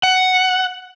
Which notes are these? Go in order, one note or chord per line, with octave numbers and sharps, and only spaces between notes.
F#5